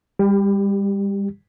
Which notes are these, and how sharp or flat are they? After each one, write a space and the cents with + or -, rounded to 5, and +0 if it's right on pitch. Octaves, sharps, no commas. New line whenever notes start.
G3 +35 G4 +0